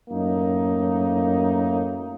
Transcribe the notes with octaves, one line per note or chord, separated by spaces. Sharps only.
F#2 A2 A#3 D#4